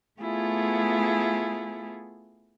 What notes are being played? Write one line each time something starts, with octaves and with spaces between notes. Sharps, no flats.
A3 B3 E4 F4 G#4